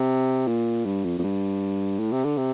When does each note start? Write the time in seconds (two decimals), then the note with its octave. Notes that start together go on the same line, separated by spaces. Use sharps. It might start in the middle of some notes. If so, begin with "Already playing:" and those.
Already playing: C3
0.48 A#2
0.85 G2
1.04 F2
1.19 F2
1.23 G2
1.99 A2
2.12 C3
2.25 D3
2.38 C3